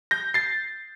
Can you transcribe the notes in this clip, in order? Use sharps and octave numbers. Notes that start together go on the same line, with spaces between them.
G6 A#6
A6 C7